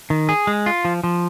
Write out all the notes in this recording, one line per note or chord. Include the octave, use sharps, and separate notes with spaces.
D#3
G#4
G#3
F4
F3
F3